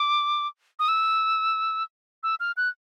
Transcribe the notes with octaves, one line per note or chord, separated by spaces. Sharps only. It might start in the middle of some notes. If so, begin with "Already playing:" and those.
Already playing: D6
D#6
E6
E6
F6
F#6